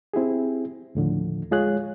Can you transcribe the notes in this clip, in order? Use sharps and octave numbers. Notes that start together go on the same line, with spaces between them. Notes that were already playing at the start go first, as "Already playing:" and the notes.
C4 E4 G4 G#4
D#2 A2 D3 F3
G#3 F4 G#4 C#5 F#6